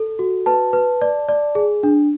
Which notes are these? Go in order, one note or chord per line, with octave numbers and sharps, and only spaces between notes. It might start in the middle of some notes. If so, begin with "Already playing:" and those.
Already playing: A4
F#4
B4 A5
B4
D5
D5
G#4
D4